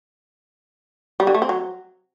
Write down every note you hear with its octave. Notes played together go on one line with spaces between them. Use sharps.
G3
D3
A3
C4
F#3